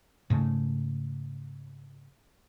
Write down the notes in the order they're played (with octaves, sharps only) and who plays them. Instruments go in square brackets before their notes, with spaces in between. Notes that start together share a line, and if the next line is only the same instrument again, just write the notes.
[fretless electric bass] G#2 C#3 A3